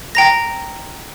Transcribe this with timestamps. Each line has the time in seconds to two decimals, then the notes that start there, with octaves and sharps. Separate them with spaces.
0.15 G5 A#5 A#6